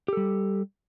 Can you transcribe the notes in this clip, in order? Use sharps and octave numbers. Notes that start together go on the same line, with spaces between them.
G3 G4 A4